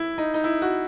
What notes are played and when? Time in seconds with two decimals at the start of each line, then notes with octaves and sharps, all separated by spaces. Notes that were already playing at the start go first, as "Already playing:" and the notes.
Already playing: E4
0.18 D#4
0.34 D#4
0.44 E4
0.62 F#4